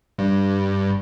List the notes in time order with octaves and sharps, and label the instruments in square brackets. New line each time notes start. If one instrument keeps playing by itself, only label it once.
[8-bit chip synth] G2